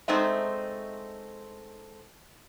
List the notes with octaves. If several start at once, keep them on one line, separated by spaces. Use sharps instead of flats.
G#3 A3 C4 D#4 E5